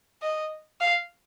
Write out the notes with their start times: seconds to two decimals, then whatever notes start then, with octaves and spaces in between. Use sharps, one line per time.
0.22 D#5
0.81 F5